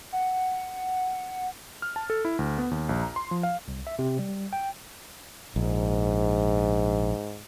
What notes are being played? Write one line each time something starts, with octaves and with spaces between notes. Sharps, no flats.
F#5
F6
A5
A4
E4
D2
B3
D#2
A#1
A#5
C6
F3
F5
C2
E5
C3
G3
G5
A#1 G#2